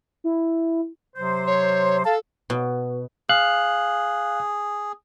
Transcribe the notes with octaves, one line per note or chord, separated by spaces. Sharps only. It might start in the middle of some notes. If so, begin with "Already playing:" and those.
E4
C3 F#3 C5
C#5
A4 F5 A5
B2
G#4 F5 F#6